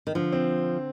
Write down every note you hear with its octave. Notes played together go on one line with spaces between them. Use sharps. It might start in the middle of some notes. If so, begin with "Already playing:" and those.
D#3
D3 F3
C4